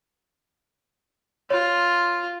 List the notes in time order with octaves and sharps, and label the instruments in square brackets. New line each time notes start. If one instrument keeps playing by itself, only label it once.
[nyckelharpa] F4 [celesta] C#5